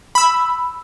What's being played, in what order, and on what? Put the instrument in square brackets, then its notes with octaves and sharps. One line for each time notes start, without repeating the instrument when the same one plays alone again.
[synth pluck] B5 E6